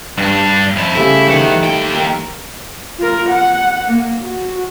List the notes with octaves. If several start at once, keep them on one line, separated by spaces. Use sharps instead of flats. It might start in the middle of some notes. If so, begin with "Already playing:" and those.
G2 D4
F2 E4
C#3 G3 A3 E4
D#3 E3 C#5 F#5
D#2 G5 B5
A#4
F4 A#4
F#5
A#3
F#4